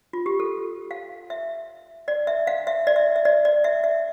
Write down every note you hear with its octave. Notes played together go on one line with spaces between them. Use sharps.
F4
G4
A4
F5
E5
D5
E5
F5
E5
D5
E5
E5
D5
D5
E5
E5